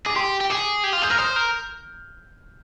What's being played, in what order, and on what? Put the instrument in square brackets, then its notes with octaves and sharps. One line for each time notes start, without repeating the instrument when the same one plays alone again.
[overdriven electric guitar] G#4 [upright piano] D6
[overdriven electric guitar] G4 [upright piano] C6
[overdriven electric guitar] G4
[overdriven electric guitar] G#4 [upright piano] D6
[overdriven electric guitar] G4
F4
[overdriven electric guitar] G#4 [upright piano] G6
[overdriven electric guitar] A#4 [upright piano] F6
[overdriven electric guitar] C5 [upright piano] D#6
[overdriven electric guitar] A#4